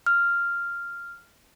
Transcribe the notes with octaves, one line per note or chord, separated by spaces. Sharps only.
F6